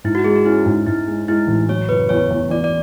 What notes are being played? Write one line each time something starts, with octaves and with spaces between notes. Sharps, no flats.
G#2 E4
F#4
G#3 G#4
F#4
C#4 E4
G#2
G#2 E4
G#3
G#3 E4
A1
F#3 C#5
F#1 B4
E2 C#5
E2
E2 D5
D5